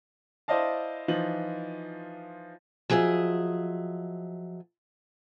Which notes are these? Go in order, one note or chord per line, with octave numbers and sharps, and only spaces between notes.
E4 C5 D5 D#5 F5 A5
E3 F3 D#4 F4 F#7
F3 F#3 G#4 D#5 E5